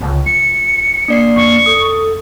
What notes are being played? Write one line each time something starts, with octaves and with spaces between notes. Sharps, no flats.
C#2 D3
F4 C#7
A#3 D4 D5 C7
F2 C#6
A4 D#6